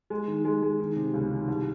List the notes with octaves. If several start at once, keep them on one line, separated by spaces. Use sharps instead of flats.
G#3
D#3
G#3
G#3
D#3
C3
C#2
D#3
C2